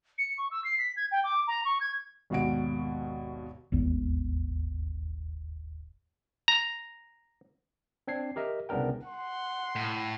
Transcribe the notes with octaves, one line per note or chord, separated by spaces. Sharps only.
C#7
C#6
E6
C7
B6
G#6
G5
D6
A#5
C#6
G#6
G#1 D#2 B2 F#5 D7
D#1 G#1 E2 B3
A#5
C4 D4 G#6 C7
G4 A#4 D#5 E5
C2 C#3 B3 D4 A#4 G5
F#5 C6
A2